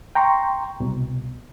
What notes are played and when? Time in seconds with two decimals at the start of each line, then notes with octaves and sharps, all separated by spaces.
0.15 G5 A#5 C6 C#6
0.80 C2 B2